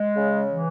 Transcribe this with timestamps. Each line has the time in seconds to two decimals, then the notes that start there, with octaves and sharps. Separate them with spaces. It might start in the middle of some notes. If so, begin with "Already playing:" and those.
Already playing: G#3
0.16 C#3
0.50 E3